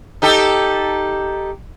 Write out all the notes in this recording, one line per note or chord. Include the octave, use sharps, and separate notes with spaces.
D#4 G4 A4